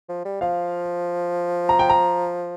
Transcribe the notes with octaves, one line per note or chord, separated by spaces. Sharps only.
F3
G3
F3 F5
A#5
G5
A#5